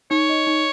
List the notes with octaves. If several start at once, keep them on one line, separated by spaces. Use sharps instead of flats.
D#4 C#5
D#5
D#4